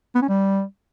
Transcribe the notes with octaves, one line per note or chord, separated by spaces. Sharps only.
B3
C#4
G3